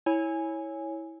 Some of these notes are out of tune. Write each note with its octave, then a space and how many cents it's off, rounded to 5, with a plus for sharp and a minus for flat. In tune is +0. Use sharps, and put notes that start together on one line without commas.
E4 -15 C#5 +0 G#5 +0